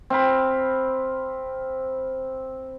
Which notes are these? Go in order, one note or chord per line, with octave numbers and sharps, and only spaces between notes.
C4 F5 B5